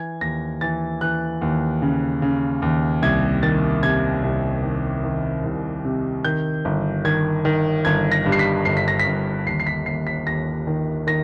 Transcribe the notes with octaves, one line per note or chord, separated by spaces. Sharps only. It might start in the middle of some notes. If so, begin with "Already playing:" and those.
Already playing: E3 G#6
D#2 A#6
E3 A6
E3 F#6
D#2
C#3
C#3
D#2
C2 G#6
D#3 A6
C3 G#6
C2
D#3
D#3
C2
C3
D#3 G6
G1
D#3 G#6
D#3
G1 G#6
A#6
G2
C7
B6
G1 C7
B6
A#6
B6
G1
D#2 C7
C7
B6
D#2 C7
B6
D#2 A#6
D#3
D#3 A#6